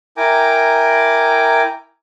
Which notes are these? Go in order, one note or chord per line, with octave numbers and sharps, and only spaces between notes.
E4 A#4 G5 G#5 A#5 D6